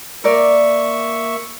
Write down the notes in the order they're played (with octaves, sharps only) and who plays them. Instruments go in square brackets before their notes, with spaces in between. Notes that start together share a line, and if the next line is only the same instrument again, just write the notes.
[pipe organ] A#3 E5 C#6 [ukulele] A#4 D5